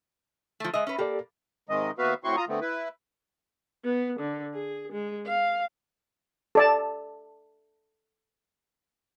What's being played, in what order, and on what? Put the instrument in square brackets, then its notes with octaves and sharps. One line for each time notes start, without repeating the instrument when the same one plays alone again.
[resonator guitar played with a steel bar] F3 A3
[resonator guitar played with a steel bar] G#3 D#5 [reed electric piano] E5
[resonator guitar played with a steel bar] C#4 B4
[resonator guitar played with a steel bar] A#3 [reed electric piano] G4 A4 D5
[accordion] G#2 C3 D#3 G#3 D#5
D#2 B3 F#4 B4 E5 F5
A2 C4 E4 F#4 C6 C#6
F4 A#5 D#6
D3 A3 B3 C4
E4 B4
[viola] B3
D3
G#4
G#3
F5
[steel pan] A4 D5 A5